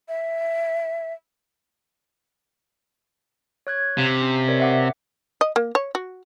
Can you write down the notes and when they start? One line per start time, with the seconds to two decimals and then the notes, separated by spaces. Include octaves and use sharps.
0.08 E5
3.67 C#5 F#6 G#6
3.98 C3 F5
4.22 C#4
4.48 A#4 C#5 D5
4.60 E5 F#5 D6
5.41 D#5
5.56 A#3
5.75 C#5
5.95 F#4